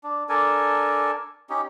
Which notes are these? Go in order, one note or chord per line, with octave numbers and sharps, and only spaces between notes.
D4
D4 A4 A#4 G#5
C#4 D#4 G4